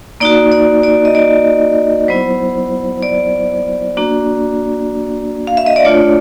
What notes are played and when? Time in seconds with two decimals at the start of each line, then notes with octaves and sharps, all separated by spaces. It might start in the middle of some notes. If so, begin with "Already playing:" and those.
0.20 A#3 D#4 F#4 D5
0.52 D5
0.83 D5
1.05 D#5
1.15 D5
2.08 F#3 B3 E4 C5
3.03 D5
3.97 A#3 D4 F#4
5.47 F5
5.57 E5
5.66 D#5
5.76 D5
5.85 A3 D4 F4 C#5